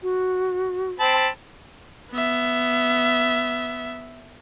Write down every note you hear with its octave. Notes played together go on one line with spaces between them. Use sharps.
F#4
C4 A5 B5
B3 E5